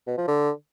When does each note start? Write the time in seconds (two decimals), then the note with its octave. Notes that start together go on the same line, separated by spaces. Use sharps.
0.07 B2
0.18 F3
0.28 D3